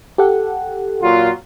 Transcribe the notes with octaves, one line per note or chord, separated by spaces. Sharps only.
G4 A4 F#5
A#2 F#3 F4